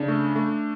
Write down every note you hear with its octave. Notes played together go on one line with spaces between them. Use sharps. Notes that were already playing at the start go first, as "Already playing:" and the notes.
Already playing: C#3 D4
A3
A3